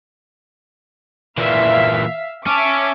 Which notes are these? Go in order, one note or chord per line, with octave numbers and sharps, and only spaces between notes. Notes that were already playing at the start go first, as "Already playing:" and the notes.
A#2 E3 E5 F5
C#4 E5 A5 D6